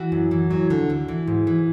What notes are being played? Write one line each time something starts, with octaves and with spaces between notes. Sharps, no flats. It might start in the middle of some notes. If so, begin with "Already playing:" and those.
Already playing: E3 F#4
F#2
E3
F#3
D3
D2
E3
G#2
E3